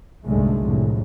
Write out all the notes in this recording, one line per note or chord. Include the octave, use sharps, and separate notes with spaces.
F#1 C2 G#2 D3 G#3 A3
C2 F2 A2 D3